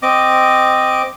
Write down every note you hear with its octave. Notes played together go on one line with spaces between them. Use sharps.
C4 D#5 D6